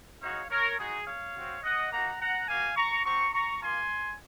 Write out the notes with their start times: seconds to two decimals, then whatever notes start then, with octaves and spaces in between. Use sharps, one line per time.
0.21 G#3 D#4 F#4 C#5 F5
0.50 A#4 C#5
0.78 G#3 D#4 F#4 G#4
1.06 C#5 F5
1.35 C4 F#4
1.63 D#5 F#5
1.91 A#3 D#4 F#4 F#5 A#5
2.20 F#5 A#5
2.48 A#3 C#4 F#4 F5 G#5
2.76 A#5 C#6
3.05 C4 F#4 A#5 C#6
3.33 A#5 C#6
3.61 A#3 F4 G#5 C6